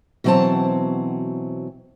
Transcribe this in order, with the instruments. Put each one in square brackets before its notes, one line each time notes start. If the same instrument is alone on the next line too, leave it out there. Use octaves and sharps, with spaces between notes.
[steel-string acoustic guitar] B2 E3 F#3 C4 C5 A5